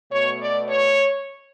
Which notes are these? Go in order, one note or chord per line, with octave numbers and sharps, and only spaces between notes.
B2 A3 C#5
D5
C#5